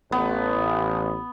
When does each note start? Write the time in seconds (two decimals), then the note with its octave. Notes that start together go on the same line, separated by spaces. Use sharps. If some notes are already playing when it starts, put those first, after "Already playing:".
0.12 A1 B3